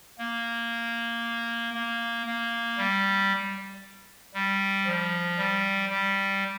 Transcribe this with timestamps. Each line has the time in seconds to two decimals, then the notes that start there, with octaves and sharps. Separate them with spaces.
0.18 A#3
1.74 A#3
2.26 A#3
2.78 G3
4.34 G3
4.86 F3
5.38 G3
5.89 G3